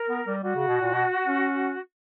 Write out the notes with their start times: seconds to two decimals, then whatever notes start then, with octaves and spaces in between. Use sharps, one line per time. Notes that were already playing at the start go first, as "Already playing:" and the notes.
Already playing: A#4
0.09 B3
0.27 G3
0.43 G3 F#4
0.55 C#3
0.68 B2
0.81 A#2
0.93 B2
1.27 C#4